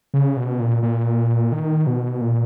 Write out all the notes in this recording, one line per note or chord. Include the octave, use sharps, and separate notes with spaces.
C#3
B2
A#2
A#2
D#3
B2
A#2